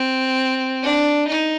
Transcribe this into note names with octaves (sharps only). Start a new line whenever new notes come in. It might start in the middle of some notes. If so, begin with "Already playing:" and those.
Already playing: C4
D4
D#4